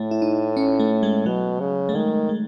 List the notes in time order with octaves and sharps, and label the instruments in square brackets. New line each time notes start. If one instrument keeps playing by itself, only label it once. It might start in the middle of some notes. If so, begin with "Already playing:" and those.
Already playing: [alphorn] A2 [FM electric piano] A3
[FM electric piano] E4
D#4
C#4
A3
G#3
[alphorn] B2 [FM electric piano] F#3
[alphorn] C#3
[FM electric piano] A3
[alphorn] D#3 [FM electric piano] G#3
[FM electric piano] G#3